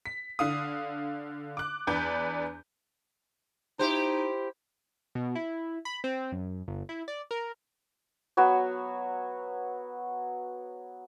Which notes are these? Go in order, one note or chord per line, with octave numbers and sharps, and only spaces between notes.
B6
D3 F5 D#6
D6 F#6
E2 D4 B4 D5 G6
D#4 E4 G4 C5
B2
E4
B5
C4
F#2
G1
E4
D5
A#4
F#3 B3 F#4 C#5